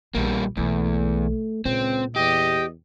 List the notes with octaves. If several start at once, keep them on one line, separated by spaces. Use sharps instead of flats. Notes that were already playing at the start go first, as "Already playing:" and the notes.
A#1 E2 G3 A#3
B1 E2 A3 A#3
C#2 A#2 C4
E2 G4 D#5